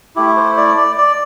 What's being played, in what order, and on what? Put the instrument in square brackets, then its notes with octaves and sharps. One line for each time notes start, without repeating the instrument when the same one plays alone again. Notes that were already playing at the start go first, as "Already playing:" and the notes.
[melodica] A3 E4 G4
C5
D5
D5
D5